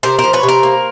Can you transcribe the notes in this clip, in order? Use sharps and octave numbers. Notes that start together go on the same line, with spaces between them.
C3 A#4 C5
A#4 C5
F3
B4 C#5
C3
A#4 C5
A#3